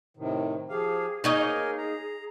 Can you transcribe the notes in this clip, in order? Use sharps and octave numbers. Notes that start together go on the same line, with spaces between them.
A2 C3 D#3
F3 G4 G#4 F5
A#3 D#4 G#4 A#4 C#5 D#5 G#5
A#5